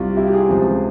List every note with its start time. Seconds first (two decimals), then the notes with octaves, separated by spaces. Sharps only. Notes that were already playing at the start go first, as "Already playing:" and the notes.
Already playing: C2 C3 G3 F4
0.16 E4 G4
0.27 G4
0.33 F4 G#4
0.49 C#2 C3 F3